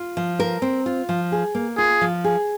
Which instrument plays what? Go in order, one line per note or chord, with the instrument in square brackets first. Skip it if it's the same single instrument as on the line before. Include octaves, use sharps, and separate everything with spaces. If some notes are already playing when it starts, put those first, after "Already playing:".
Already playing: [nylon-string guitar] F4
F3
A#4
C4
F4
F3
G#4
A#3
[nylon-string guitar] F4 [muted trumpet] G#4
[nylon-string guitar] F3
G#4